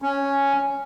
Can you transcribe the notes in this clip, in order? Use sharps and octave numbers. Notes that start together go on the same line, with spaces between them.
C#4